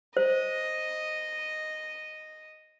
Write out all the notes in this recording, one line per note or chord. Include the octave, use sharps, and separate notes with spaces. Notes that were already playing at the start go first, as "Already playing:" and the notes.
C5 D#5